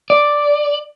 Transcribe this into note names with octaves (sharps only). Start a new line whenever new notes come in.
D5